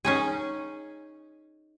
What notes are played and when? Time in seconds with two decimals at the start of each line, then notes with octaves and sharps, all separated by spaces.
0.05 C#4 D#4 G#4